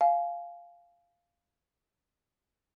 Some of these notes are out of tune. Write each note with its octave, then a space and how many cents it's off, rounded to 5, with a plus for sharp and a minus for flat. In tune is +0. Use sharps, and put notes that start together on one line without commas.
F5 -5 G#5 +30